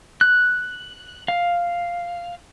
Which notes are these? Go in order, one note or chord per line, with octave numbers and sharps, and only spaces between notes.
F#6
F5